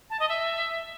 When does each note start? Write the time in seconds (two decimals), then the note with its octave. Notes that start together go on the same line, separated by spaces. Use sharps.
0.10 A5
0.20 D#5
0.29 E5